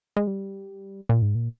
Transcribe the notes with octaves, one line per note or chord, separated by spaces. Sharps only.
G#3
G3
A#2
G#2
A#2